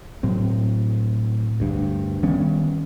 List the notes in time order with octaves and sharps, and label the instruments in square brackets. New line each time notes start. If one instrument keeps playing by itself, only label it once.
[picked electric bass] A2 F#3 C4
D2 G2
D#3 G3 B3 C#4